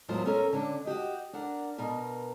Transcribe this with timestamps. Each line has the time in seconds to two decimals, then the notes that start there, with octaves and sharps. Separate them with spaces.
0.08 E2 A2 F#3 F4 A#4 C5
0.26 C#4 A4 A#4 C#5
0.53 D3 C#4 D4
0.85 F#4 G4 D#5
1.33 D4 A#4 F#5
1.78 B2 A#4 B4